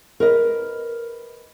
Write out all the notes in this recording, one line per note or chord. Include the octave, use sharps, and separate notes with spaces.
A#4 B4 D#5